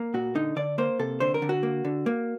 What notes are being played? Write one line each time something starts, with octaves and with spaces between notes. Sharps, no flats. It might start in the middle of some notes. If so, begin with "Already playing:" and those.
Already playing: A#3
A#2 F#4
D3 D#4
D3 D5
A#3 C5
C3 A4
D3 C5
A#4
D3
F#4
A#3
D3
A#3